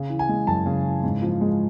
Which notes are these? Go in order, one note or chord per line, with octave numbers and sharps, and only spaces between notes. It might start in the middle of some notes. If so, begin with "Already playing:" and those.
Already playing: C#3
E3
G#5
G#3
F#2 A5
C#3
E3
G#2
F3
G#3